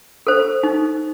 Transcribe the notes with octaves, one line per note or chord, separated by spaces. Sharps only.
A4 C5
D#4